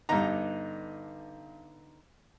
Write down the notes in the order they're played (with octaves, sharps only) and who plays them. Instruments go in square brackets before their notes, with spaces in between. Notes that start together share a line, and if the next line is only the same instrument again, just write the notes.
[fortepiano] G2 A#5 [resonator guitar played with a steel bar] D3 B3 D#4